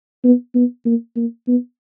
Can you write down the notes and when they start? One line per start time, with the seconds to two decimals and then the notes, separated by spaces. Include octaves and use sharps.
0.24 B3
0.55 B3
0.85 A#3
1.16 A#3
1.48 B3